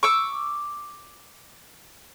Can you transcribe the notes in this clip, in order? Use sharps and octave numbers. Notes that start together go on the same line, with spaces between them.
C#6 D6 E6